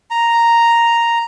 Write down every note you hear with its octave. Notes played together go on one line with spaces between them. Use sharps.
A#5